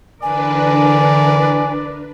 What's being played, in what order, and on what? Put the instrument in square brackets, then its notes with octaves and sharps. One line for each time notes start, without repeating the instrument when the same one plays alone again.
[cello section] D3 E3 A#4 [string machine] D4 B4 [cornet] D5 [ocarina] G#5